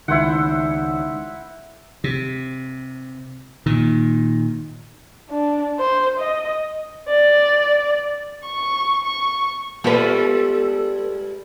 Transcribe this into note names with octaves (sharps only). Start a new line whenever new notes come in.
C#2 D#3 E4 C5 F#5
C3
A#2 D#3
D4
C5
D#5
D5
C#6
C#6
G3 G#3 B3 F4 A4 B4